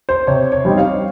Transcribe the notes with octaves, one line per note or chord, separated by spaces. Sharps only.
C5
C3 C#5
C#5
G3 C4 D#4
F5